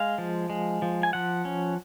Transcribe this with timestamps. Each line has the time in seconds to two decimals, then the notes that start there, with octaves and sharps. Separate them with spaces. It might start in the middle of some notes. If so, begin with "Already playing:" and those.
Already playing: G#3 F5
0.18 F3
0.50 G#3
0.82 F3
1.03 G#5
1.13 F3 F#5
1.45 C#4